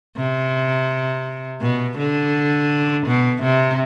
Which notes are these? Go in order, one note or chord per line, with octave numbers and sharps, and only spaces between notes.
C3
B2
D3
B2
C3